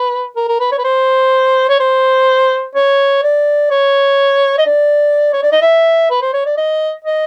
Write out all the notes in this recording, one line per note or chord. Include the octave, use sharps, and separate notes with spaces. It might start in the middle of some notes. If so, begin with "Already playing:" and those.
Already playing: B4
A#4
A#4
B4
C#5
B4
C5
C#5
C5
C#5
D5
C#5
D#5
D5
C#5
D5
D#5
E5
B4
C5
C#5
D5
D#5
D#5